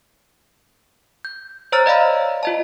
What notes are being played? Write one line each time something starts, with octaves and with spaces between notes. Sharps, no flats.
G6
C5 C#5 A#5 E6 F6 A6
D5 D#5 F5 A#5 B5
F4 D#5 A5